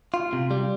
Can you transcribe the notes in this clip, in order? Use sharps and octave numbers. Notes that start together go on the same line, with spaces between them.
F4
C3
G3